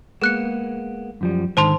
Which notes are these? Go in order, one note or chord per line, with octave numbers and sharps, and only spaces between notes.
G#3 A#3 B3 G#4 F#6 C#7
F#2 F3 G3
G#2 D3 D#3 C5 A5 C6